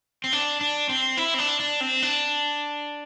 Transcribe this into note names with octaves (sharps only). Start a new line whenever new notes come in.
C4
D4
D4
C4
E4
C4
D4
D4
C4
D4